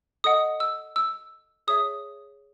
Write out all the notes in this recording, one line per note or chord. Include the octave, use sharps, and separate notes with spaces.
A4 D#5 F#5 D#6
E6
E6
G#4 C#5 E5 D#6